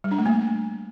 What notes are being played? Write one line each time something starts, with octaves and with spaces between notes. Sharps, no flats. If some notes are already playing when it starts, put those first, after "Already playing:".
G3
D4
A3
A#3